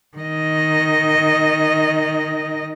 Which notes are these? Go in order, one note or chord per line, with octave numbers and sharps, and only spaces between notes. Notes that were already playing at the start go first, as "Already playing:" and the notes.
D#3 D#5